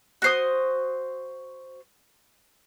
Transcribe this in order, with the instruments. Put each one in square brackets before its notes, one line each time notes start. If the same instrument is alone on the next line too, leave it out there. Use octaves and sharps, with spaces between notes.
[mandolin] F#4 C5 D#6